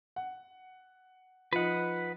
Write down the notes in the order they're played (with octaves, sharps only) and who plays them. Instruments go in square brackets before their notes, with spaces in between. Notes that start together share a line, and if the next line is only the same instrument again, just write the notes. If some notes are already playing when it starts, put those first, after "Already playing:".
[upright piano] F#5
[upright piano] F3 D#4 [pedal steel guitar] B4 F#5